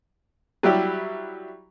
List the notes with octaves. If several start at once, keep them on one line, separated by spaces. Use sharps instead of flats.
F#3 G3 E4 G4